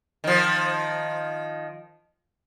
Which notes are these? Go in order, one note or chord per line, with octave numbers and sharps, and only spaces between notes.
D#3 F3